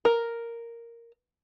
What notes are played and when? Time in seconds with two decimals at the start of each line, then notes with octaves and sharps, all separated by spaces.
0.05 A#4